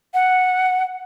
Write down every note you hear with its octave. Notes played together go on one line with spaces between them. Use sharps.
F#5